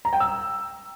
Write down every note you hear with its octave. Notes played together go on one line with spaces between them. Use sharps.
A#5
G5
E6